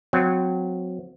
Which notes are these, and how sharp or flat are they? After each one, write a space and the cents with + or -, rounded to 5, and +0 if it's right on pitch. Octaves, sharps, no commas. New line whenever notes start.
F#3 -20 C4 -25